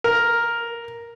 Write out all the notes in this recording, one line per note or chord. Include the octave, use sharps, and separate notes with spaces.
A#4